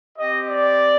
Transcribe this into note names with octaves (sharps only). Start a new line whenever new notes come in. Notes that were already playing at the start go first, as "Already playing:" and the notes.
C4 G4 D#5
D5